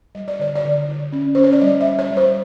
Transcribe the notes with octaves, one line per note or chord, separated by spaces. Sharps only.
G3 D#5
D5
D3 C#5
D5
D3
D3
C#4
C#4 C5
C#5
D5
G3 D#5
E5
G3
C#5
G3
C5